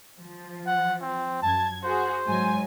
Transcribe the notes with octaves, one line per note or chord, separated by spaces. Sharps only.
F3
F#5
C4
F#2 A5 G#6
F#4 G#4 C5
G#2 F#3 G#5